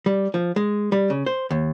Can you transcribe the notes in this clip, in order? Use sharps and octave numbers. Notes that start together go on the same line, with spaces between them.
G3
F3
G#3
G3
C#3
C5
D#2